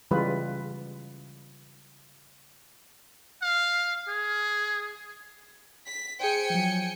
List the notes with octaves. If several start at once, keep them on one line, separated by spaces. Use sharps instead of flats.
C#3 E3 G3 G#3 F4 B4
F5
G#4
B6
G#4 C5 G5 G#5 C#7
F3 F#3